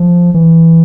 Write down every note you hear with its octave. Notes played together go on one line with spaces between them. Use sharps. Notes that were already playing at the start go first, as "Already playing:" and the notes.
Already playing: F3
E3